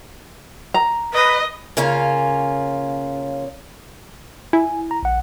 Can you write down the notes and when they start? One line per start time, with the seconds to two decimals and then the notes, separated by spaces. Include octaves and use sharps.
0.74 A#5
1.14 B4 D#5
1.77 C#3 A#3 C#4 F4
4.53 E4 G#5
4.91 A#5
5.03 A#1 F#5